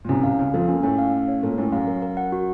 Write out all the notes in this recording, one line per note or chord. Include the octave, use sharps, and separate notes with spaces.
A#2
C2 C3 C#4
C2 C3 F5
C#2 C#3 F5
F2 F3 A4
A#3 C#4
A2 A3 C#4
F5
C#4
C#5
A#2 A#3 A4
A2 A3 C#4
F#2 F#3 F5
A#4
A#4
F#5
F#4